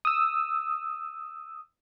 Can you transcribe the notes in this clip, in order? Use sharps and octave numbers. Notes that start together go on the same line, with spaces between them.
D#6 E6